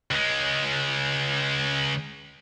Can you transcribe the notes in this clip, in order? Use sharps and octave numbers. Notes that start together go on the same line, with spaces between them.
C#2 G#3